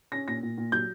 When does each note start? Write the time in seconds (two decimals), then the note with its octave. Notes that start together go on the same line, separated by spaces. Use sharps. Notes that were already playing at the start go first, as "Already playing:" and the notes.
0.12 C#4 A#6
0.27 A#2 A#6
0.43 A#2
0.58 A#2
0.72 F#3 G6